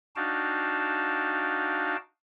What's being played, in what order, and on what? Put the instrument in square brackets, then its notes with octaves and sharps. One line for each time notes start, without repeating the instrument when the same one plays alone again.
[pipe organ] D4 D#4 F#4 F5 G5 A5